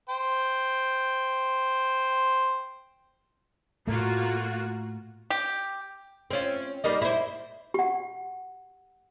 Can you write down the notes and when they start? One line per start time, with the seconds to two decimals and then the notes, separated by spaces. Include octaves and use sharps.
0.09 C5 G5
3.87 A2 A3 A#3 F4 F#4
5.30 G4
6.31 C4 C#4 F4
6.84 G3 A#3 D#4
7.02 E4 C5
7.74 G4 F#5